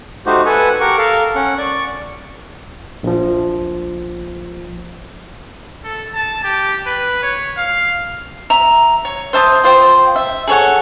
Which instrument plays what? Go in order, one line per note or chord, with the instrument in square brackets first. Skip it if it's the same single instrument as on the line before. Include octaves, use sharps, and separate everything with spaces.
[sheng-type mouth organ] A3 D#4 F#4 G4 C5
A4 B4 F#5 G#5
G4 A#4 F#5 C#6
A4 A#4 F5
C#4 F#5
D5 C#6
[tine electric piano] A#1 F3
[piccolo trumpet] A4
A5
G4
B4
C#5
F5
[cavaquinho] E5 A#5
C#5
C5 E5 A5 D#6
F4 C5 G5
E5
G#4 A4 C#5 F#5